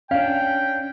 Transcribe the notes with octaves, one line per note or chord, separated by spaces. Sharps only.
C#4 D4 F5 G5